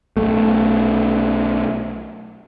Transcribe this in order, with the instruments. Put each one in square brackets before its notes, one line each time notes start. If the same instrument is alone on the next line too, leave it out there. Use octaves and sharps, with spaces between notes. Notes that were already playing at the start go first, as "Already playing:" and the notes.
[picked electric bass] B1 A3